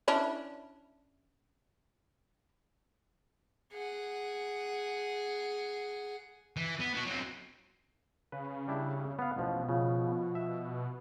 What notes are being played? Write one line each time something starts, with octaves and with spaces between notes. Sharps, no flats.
C#4 D4 E4
G#4 F#5
E3
B3
B3 F#4
F#3 C4
C#3 B4
G3 D4 E4
B3 F5
A1 B2 F3
C#3 F3
E5